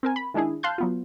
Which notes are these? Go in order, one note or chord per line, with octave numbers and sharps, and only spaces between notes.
C4 A#4 G#5
B5
D#3 G#3 D4 E4 G#4
F5 A5 C6 F#6 G6
F#3 B3 F4